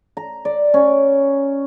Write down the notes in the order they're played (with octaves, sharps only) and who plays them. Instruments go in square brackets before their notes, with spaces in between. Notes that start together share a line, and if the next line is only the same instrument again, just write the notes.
[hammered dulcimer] A#5
D5
C#4